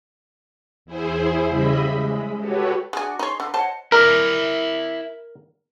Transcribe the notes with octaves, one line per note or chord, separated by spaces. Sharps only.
E2 E4 G#4 C5
C#3 G3 D#5 E5 B5
G#3
F#4 G4 A4 B4 C#5
G#3 D4 F#4 G#4
D#4 G#4 C#5 C6
D3 D#4 B4
C5 C#5 D#5 F#5 A5
E4 A#4 D5